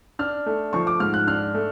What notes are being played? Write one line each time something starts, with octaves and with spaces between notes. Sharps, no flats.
D4 F6
A3
F3 C#6
D6
G#2 F6
F#6
D4 F6
A3